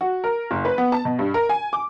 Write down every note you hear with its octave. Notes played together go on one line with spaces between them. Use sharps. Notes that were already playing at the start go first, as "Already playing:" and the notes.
F#4
A#4
F#1
B4
B3
A5
B2
G2
A#4
G#5
D6